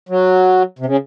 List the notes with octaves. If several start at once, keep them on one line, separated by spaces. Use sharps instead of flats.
F#3
C3
C#3